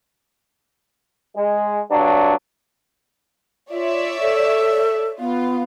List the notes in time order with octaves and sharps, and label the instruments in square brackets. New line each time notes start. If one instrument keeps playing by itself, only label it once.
[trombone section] G#3
G2 F#3 D4
[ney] F4 [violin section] C#5 D5 E5
[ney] A4
[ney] B3 [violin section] F4